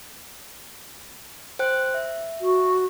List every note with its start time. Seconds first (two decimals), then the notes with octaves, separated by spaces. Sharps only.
1.59 C5 G5 F#6
1.94 E5
2.41 F#4